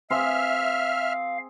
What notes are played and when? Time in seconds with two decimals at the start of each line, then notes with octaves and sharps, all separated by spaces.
0.10 C4 G#4 E5 F5 C6 F6